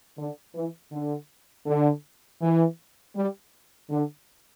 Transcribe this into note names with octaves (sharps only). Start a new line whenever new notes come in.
D3
E3
D3
D3
E3
G3
D3